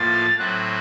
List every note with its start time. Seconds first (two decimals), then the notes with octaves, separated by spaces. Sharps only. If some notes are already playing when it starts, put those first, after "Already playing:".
Already playing: A2 F3 A#3 F4 A6
0.38 A2 F#3 C4 F#4 F#6